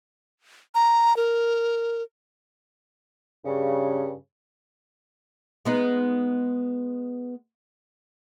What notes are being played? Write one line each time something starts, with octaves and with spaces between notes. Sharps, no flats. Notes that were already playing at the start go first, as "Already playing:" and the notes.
A#5
A#4
G2 C#3
G#3 B3 D#4